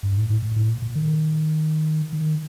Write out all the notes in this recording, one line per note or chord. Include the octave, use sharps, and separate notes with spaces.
G2
A2
A2
A2
A2
A#2
A#2
D#3
D#3